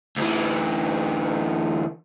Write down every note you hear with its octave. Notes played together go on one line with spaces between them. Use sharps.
D2 E3